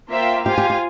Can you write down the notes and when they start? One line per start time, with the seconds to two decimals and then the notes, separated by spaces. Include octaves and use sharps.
0.10 A#3 F4 C5 E5 G5
0.46 F4 G4 C5 F5 G#5
0.58 G4
0.70 G4